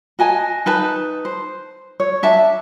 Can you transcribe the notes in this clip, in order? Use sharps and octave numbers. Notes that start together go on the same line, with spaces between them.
F#4 D#5 G#5 A5
D#4 B4 A5
C5
C#5
D4 E5 A5